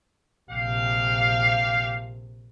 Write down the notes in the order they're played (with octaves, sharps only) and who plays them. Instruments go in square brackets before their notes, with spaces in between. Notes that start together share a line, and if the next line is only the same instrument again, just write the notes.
[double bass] A#1 C3 [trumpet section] G4 F5